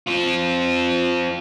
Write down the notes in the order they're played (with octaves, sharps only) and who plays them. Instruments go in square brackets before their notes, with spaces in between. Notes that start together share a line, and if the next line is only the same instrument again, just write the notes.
[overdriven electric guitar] C4 F4